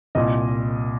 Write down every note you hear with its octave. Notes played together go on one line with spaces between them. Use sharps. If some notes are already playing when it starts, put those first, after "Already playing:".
C2 A#2 D#5